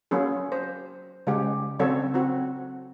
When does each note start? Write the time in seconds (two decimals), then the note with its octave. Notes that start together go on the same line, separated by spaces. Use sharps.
0.11 F#3 A#3 C#4 G#4
0.52 C5
1.27 C#3 G#3 G4
1.79 C#3 F#3 C4 A4 C#5
2.14 C4 F#4